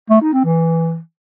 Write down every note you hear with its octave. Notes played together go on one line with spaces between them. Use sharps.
A3
D#4
C4
E3